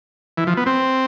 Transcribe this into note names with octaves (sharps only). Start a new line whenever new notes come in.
E3
F3
B3
C4